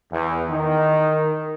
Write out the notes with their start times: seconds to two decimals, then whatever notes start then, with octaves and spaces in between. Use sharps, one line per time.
0.11 E2
0.49 D#3